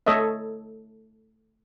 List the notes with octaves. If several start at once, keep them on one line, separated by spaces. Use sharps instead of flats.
A3 A4 C#5 D#5 E5